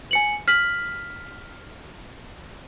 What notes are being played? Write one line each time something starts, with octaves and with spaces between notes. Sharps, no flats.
G#5 C#7 F#7
F6 B6 F#7